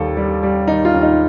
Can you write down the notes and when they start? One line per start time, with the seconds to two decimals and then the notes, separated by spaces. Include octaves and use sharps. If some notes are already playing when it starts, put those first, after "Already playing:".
Already playing: D#2 G3 A4
0.17 G3
0.43 G3
0.67 D#3 D#4
0.85 F4
0.94 D#2
1.02 D#4